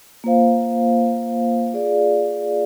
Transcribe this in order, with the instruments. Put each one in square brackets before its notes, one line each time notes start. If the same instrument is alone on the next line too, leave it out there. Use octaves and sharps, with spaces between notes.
[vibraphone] A#3 F4 C5 F5
F4 G#4 D5 F5